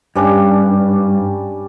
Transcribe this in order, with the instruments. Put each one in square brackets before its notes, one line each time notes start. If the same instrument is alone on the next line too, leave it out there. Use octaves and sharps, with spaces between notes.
[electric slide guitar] G2 [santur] G3 C#4 D4